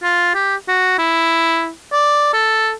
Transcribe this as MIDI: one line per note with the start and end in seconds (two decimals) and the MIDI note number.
0.03 0.33 65
0.35 0.56 67
0.68 0.98 66
0.98 1.70 64
1.92 2.29 74
2.33 2.72 69